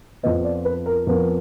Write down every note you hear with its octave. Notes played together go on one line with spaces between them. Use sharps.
F2 F3 B3 D#5
D5
B4
A#4
F2 F3 B3 A#4